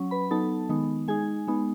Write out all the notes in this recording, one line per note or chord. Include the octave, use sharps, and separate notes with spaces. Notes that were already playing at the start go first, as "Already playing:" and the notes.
Already playing: F#3 C#4
B4 B5
F#3 B3 D#4 A4 A5
D#3 G#3 B3 D#4
G#3 D#4 G#4 G#5
G#3 B3 D#4